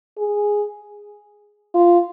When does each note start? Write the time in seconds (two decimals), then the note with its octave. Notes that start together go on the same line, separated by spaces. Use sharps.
0.18 G#4
1.75 F4